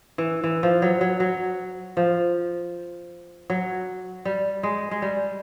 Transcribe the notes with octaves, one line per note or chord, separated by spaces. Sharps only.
E3
E3
F3
F#3
F#3
F#3
F3
F#3
G3
G#3
G#3
G3